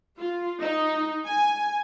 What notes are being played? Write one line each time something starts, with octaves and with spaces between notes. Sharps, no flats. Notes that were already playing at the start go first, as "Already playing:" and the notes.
F4
D#4
G#5